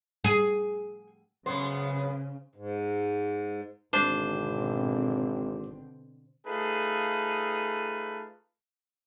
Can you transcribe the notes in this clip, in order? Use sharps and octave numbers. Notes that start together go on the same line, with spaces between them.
G#4
F#2 C#3 B3 C5
G#2
G#1 B2 D3 C4 D4 C5
A3 D#4 F4 G#4 A4 B4